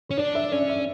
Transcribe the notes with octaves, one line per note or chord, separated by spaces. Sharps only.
C#4 C#5
D4 D5
E5
C#4 D5
E5